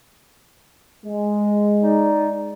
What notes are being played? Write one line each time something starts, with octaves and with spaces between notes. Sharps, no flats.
G#3
D#4 D5